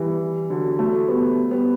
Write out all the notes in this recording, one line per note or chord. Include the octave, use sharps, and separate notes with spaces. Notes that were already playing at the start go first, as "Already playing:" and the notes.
Already playing: E3 G3
D3 F#3
F#3 A3
G3 B3
G3 B3